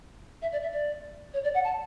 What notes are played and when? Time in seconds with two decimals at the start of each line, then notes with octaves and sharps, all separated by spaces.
0.41 E5
0.52 D5
0.62 E5
0.72 D5
1.33 C#5
1.43 D5
1.54 F#5
1.64 A5